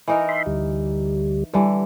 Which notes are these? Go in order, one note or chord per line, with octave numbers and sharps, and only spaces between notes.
E3 D#4 A#4
E5 B5 C6
D2 G3
D3 E3 G3 B4